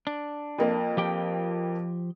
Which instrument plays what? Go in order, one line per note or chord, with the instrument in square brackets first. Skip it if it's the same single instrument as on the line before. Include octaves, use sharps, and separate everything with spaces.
[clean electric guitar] D4
[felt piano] F2 A#3
[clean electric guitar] F3 G4 G5